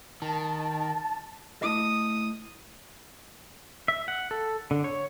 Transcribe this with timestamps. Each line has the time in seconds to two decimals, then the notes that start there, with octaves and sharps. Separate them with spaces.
0.22 D#3 A5
1.62 A3 E4 D#5 D#6
3.88 E5
4.08 F#5
4.31 A4
4.71 D3
4.84 C#5